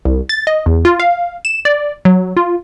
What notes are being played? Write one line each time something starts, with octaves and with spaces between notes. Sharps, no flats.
C2
A6
D#5
E2
F4
F5
E7
D5
F#3
F4